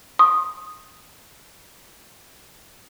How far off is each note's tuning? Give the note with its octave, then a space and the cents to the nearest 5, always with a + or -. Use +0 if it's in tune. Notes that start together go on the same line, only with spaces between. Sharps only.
C6 +45 D#6 +0